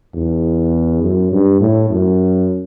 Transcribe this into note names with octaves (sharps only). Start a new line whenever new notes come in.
E2
F#2
G2
A2
F#2